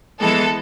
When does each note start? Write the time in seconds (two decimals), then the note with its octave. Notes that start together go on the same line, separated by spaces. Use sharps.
0.20 E3 G#3 B3 A4